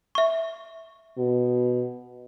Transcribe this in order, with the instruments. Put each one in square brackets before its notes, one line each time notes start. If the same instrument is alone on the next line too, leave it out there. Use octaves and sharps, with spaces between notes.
[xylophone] E5 C#6
[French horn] B2